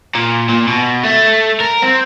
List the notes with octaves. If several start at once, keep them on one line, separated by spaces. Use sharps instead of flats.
A#2
A#2
B2
A3
A#4
C4